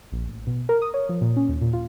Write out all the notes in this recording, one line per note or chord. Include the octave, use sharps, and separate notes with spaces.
A#1
A1
B2
A#4
D#6
C#5
F3
A#2
C#4
D#2
A#2
F4